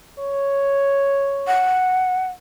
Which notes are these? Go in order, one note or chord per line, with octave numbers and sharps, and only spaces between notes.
C#5
F#5